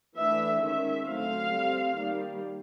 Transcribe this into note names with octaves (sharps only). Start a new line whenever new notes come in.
E3 A3 D4 E5
D#3 G#3 C#4 E5
D3 F#3 A3 C4 F5
G3 C4
D#3 G3 A#3